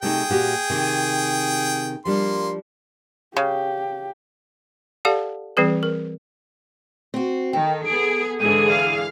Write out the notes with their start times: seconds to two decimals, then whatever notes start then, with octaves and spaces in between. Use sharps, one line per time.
0.02 C3 A3 D#4 G#4 G5
0.30 A#2 F#4 G4
0.70 C3 D#3
2.05 F3 G3 A#3 D4 C6
3.37 C#3 G4
5.05 G4 A4 D5 F5 F#5 A5
5.57 E3 G3 C4 G#4 B4
5.83 A#4
7.14 C4 F#4
7.53 D#3 A4 G5
7.86 B3 G#4 D7
8.40 G#2 D3 E3 G#4 D#7
8.69 F5